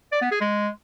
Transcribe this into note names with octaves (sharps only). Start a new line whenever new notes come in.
D5
B3
G#4
G#3